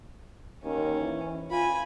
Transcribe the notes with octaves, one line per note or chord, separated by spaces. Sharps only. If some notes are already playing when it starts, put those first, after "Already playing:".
D#2 C#4
E3
F4 G#5 B5